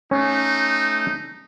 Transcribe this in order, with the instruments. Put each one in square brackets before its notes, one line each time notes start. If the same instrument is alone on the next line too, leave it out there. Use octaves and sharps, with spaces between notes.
[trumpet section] A3 D#4 [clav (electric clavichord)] C#4